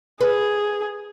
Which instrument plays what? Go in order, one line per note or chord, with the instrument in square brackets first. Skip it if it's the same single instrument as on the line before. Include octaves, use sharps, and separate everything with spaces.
[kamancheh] G#4 [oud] B4